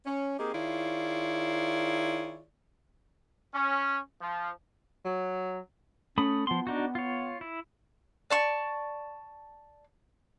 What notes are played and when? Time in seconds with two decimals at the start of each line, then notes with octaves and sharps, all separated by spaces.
0.06 C#4
0.39 A#3 C4 D#4 G4 G#4
0.54 D#3 E4 F4 G#4 C#5 D5
3.54 C#4
4.21 F3
5.05 F#3
6.18 A3 C#4 B5 D#6
6.47 F3 B3 C6
6.67 D4 D#4 F#4
6.95 F4 C#5
7.41 E4
8.30 D5 A5 C#6